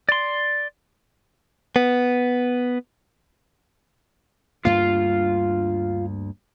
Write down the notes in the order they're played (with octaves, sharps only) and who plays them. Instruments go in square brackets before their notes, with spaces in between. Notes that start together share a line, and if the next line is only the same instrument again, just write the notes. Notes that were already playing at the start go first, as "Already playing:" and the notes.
[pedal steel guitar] D5 C6
[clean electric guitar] B3
[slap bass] D2 G2 A#3 [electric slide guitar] F4 F5